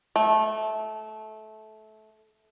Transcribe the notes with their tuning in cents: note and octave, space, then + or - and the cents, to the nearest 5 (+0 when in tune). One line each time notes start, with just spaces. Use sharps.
A3 -20